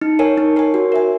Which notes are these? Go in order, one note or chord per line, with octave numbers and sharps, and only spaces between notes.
D#4
A#4 C#5 G#5
D#4
A#4 C#5 G#5
F#4
A#4 E5 G#5